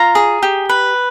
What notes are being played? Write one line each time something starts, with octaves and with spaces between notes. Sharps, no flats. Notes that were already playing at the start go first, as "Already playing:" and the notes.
Already playing: F4 A#5
G#4
G4
B4